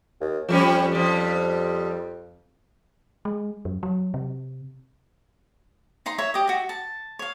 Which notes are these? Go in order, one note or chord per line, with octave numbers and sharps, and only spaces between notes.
D#2
F2 F3 G3 C#4
F3 G3
G#3
F#2
F#3
C3
D#4 A#5 C6
C#5 E5
G4 D#5
F#4 E5
A5
C#5 F5